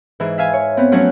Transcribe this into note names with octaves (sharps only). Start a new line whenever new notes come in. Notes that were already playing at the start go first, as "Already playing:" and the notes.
G#2 E3
E5 F5 G#5
C#5
B3 C4
F3 F#3 A3 C#4 F#4 C#5